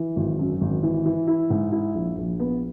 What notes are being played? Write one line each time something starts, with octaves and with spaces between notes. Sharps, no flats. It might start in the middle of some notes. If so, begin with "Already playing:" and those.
Already playing: E3
G#1
F#2
G#1
E3
E3
E4
G#2
E4
A#1
A#1
B3